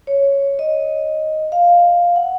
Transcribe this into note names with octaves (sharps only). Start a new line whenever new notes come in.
C#5
D#5
F5
F#5